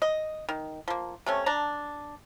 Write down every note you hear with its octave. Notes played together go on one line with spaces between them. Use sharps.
D#5
D#3
F3 A#3
C3 A3 C#4
D4 A5 A#5